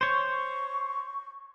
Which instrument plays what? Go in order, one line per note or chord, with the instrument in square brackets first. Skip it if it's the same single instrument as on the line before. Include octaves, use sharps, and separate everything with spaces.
[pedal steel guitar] C5 C#5 [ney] C#6